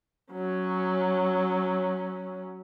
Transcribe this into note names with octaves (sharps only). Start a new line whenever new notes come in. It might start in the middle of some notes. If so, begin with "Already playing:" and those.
F#3 C#4